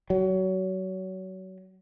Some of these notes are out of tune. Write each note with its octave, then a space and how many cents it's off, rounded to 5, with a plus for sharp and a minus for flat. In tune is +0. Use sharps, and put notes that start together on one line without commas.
F#3 +25